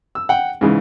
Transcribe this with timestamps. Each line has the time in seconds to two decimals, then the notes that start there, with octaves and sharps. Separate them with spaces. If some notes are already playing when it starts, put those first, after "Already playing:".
0.15 E6
0.29 F#5 G5
0.61 G#2 C#3 E3